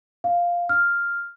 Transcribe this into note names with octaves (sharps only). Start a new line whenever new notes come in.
F5
F6